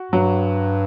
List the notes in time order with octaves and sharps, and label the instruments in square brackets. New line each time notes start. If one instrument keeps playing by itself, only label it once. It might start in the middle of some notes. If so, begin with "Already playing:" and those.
Already playing: [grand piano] F#4
[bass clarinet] G2 [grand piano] F#3